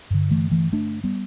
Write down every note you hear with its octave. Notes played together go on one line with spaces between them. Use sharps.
G2 D3
E3 A3
E3 A3
A3 D4
G3 B3